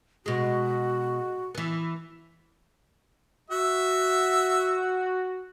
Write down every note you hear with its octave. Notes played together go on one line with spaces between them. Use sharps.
B2 G#3 F#4
E3 B3
F#4 E5